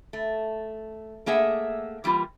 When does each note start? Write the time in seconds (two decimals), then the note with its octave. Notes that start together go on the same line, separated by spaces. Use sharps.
0.13 A3
1.26 A3 A#3 G#4 E5 F#5
2.04 E3 G3 A#3 F4